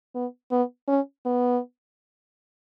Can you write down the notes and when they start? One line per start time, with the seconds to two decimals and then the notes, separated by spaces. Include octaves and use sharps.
0.15 B3
0.52 B3
0.88 C#4
1.26 B3